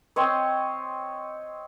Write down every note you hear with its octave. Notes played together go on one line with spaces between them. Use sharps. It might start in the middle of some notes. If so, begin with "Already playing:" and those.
C4 C5 C#5 D#5